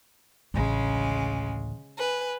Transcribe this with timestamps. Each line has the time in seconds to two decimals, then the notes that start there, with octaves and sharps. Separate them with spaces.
0.54 A1 D2 C#3 G#3
1.97 B4 G#5